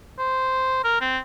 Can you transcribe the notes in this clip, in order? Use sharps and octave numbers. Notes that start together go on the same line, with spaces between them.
C5
A#4
C4